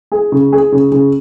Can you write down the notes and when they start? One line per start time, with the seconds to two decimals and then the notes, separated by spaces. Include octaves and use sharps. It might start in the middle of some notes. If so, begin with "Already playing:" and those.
0.12 G#4
0.32 C#3
0.52 G#4
0.72 C#3
0.92 C#3